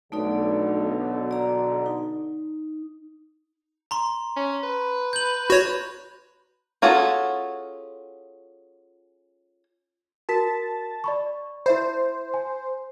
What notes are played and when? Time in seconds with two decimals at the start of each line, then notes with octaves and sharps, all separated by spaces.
0.12 B1 D3 A3 D#4 D5
1.31 D5 A#5
1.86 D#4
3.91 A#5 C6
4.36 C#4
4.63 B4
5.13 G6 F#7
5.50 F#4 C#5
6.82 C#4 F4 F#4 G#4 A4
10.29 F#4 A#4 A5 B6
11.04 D5 B5 C#6
11.66 E4 C5 E5 B5
12.34 G#5